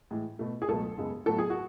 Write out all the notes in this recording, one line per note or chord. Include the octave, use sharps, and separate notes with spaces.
A2 E3 G#3
B2 A3
G#4
C#2 B2 F#3 A3 A4
F#2 C#3 G#3 B3
A2 F#3 B3 A4
G#4
F#4